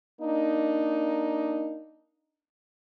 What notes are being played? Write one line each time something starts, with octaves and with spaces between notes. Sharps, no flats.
A#3 D4 D#4